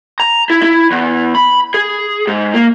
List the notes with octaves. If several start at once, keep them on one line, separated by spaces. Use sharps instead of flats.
A#5
E4
E4
E2
B5
G#4
G#2
A#3